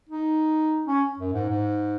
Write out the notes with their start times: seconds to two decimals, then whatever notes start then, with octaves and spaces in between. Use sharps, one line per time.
0.09 D#4
0.87 C#4
1.19 F#2
1.33 G#2
1.49 G#2